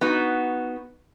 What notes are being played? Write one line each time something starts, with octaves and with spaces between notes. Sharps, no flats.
B3 D#4 F#4